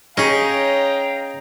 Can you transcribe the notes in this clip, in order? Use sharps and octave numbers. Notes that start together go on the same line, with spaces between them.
C#4 D#4 G#4 F5 G5 A#5